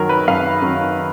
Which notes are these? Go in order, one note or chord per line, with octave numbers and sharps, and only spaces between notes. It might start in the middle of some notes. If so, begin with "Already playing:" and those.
Already playing: F#2 D#3 F#3 A#4
B4
F#2 F5
D#3 F#3